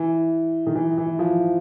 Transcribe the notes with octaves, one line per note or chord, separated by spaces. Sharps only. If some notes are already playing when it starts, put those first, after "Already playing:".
Already playing: E3
D#3
E3
E3
F3